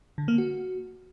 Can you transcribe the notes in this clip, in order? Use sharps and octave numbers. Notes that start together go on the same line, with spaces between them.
D3
A#3
F#4